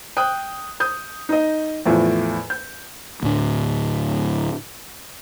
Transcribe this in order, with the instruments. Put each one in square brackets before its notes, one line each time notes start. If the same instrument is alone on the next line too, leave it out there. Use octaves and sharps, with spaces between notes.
[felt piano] G5 D#6 F#6
D#6 G6
D#4 D#5
E2 A2 F3
G6
[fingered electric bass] D2 A2 D4